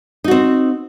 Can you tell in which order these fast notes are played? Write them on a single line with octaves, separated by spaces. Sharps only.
D#4 F#4 C4